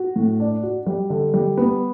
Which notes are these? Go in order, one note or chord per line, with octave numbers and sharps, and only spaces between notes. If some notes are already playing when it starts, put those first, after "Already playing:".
Already playing: F#4
A2
D4
F#4
G3
D3
G3
B3